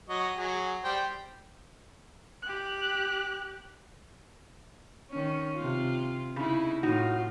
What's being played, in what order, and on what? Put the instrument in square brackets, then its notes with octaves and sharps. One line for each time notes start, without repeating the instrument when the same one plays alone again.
[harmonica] F#3 D#5 C#6
F#3 G#4
G3 C5 G5
[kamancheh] G4 F#6
[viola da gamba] D#3 C#4
C3 F4
[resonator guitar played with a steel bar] C#3 [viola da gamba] D#4 E4
[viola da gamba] A2 F4 [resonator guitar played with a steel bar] D#4 F#4